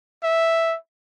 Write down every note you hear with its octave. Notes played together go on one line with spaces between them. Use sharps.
E5